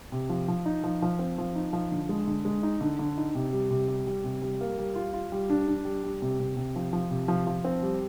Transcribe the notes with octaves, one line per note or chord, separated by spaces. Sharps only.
C3
F3
F3
D#4
F3
F3
C4
F3
D#4
F3
D3
G#3
D3
G#3
D#4
D3
D3
D#4
C3
G3
C3
G3
G3
C3
G3
A#3
G3
F4
F4
G3
D4
D4
G3
G3
C3
C3
C3
F3
F3
C3
F3
F3
C4
G3